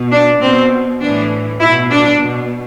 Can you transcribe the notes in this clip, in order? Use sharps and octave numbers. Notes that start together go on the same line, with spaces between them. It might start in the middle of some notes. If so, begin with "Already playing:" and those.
Already playing: B2
D4
B2 C4
A2 E3 D4
B2 E4
D4
B2